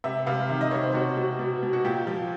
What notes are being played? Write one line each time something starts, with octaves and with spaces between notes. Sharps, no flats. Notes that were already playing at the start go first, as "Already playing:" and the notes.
C3 E5
C3 F5
D#3 E5
D#5
C3 C#5
C5
B2 F#4
B2 F#4
B2
B2
F#4
A#2 G4
F3